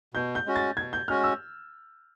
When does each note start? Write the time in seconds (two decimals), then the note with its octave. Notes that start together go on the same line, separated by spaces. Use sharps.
0.14 B2 G6
0.35 G6
0.46 G#3 C#4 F#4
0.56 A6
0.77 B2 G#6
0.93 G6
1.08 G#3 C#4 F#4 F6
1.23 E6